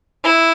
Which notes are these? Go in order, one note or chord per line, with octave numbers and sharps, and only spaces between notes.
E4